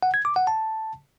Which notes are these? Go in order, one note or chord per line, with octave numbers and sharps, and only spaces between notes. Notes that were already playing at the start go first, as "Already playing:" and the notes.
F#5
G#6
D6
F#5
A5